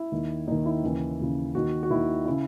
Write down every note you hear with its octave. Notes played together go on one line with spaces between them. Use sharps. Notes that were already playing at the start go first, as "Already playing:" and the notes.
Already playing: E4
D#2 D#3
D#2 D#3 D#4
E4
D#2 C#3 E3
D#2 C#3 E3
D#2 D#3 F#4
F#4
D#2 D#3 E4
C#3 E4